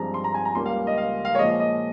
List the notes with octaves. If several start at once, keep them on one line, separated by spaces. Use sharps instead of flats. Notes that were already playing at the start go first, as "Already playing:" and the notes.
Already playing: G2 F3 G#3 C4 A#5
C6
A#5
G#5
A#5
C#2 C#3 G3 A#3 C6
F5
D#5
F5
F5
C#5
A#2 F3 G#3 D#5
D#5